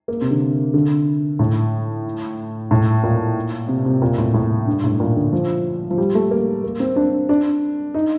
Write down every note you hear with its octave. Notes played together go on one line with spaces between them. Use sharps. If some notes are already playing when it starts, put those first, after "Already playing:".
A#3
C3
D3
D3
A2
A2
A#2
C3
C3
A#2
A2
A2
G2
A2
A#2
D3
F3
F3
G3
A3
A#3
A#3
C4
D4
D4
D#4